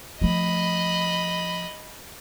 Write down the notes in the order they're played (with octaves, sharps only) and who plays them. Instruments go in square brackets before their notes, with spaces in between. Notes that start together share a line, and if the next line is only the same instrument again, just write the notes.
[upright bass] F3 A3 [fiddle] D#5 B5